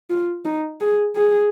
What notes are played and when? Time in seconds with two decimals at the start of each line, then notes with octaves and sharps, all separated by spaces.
0.10 F4
0.45 D#4
0.81 G#4
1.16 G#4